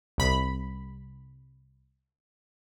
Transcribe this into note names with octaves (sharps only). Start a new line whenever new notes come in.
C2 B5